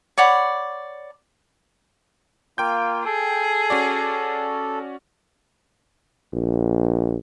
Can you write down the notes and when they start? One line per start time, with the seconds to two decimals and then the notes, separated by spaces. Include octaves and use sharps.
0.18 C#5 D5 F#5 B5
2.58 A#3 F4 G5 G6
3.06 G#4 A4
3.70 C#4 F#4 D5
6.33 A#1